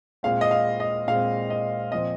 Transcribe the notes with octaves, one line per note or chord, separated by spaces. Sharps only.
A#2 G#3 C4 F5
D#5
F5
D#5
A#2 G#3 C4 F5
D#5
A#2 F3 C4 D#5